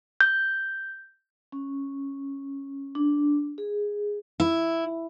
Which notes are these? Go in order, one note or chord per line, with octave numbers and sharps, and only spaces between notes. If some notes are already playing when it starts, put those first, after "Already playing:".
G6
C#4
D4
G#4
E4